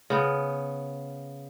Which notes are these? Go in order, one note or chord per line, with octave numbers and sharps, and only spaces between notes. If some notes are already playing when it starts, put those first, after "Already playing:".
C#3 B3